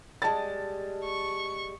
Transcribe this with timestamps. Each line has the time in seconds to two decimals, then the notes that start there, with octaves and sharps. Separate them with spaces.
0.22 G3 G#3 A5 A6
1.05 C#6